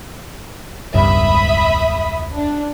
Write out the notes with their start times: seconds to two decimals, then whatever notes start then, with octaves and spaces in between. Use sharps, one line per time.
0.94 E1 C#2 G2 E5 B5 D#6
2.35 D4